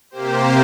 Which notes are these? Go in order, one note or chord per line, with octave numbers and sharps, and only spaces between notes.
C3 A#3 G4 C5